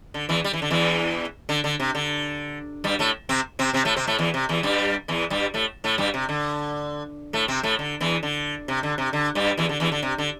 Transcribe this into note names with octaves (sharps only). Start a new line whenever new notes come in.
D3
E2 E3
G3
E3
D3
E2 E3
D3
D3
C3
D3
G2 G3
A2 A3
C3 C4
C3 C4
C3 C4
A2 A3
C3 C4
A2 A3
E2 E3
C3
E2 E3
G2 G3
E2 E3
G2 G3
A2 A3
A2 A3
G2 G3
C3
D3
A2 A3
C3 C4
A2 A3
D3
E2 E3
D3
C3
D3
C3
D3
G2 G3
E2 E3
D3
E2 E3
D3
C3
D3